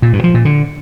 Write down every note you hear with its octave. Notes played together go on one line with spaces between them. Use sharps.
A#2
G2
F3
A#2
D3